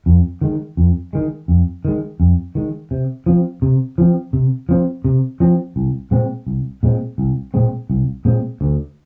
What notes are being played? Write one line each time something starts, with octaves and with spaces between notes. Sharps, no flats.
F2
D#3 G#3
F2
D#3 G#3
F2
D#3 G#3
F2
D#3 G#3
C3
F3 C4
C3
F3 C4
C3
F3 C4
C3
F3 C4
C2
A#2 G#3 C4
C2
A#2 G#3 C4
C2
A#2 G#3 C4
C2
A#2 G#3 C4
D2